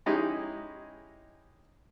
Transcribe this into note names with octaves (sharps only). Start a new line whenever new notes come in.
G#3 C#4 D#4 E4 G4 G#4